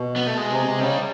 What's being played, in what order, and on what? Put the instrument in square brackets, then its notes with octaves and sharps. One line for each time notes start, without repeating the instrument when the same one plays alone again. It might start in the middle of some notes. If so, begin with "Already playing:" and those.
Already playing: [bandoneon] B2
[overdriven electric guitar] B3
A3
G#3
[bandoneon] C3
C3
[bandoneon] C#3 [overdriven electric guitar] G3